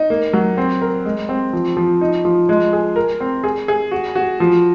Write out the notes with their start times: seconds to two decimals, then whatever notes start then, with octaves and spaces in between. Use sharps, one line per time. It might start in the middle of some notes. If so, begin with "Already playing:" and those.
Already playing: D#4
0.10 A#3
0.33 F#3
0.57 C4
0.82 A#4
1.05 G#3
1.29 C4
1.53 F3
1.77 F3
2.01 D#4
2.25 F3
2.49 G#3
2.73 G#4
2.96 A#4
3.20 C4
3.44 G#4
3.68 G#4
3.91 F#4
4.15 F#4
4.40 F3